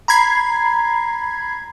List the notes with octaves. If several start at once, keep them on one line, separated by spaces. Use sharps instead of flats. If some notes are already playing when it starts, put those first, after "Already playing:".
A#5 B5 G#6 C7